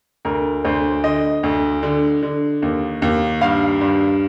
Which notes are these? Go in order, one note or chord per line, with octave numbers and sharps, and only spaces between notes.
D2 A#4
D2 C5
D3 D#5
D2
D3
D3
D#2
D#2
G2 F5
G2